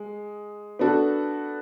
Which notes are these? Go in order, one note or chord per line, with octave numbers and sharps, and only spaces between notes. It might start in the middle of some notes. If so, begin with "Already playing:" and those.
Already playing: G#3
B3 D4 F#4 A4